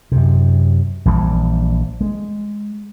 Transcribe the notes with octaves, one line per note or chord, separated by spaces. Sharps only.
F#2 C3
A#1 E3 G3
G#3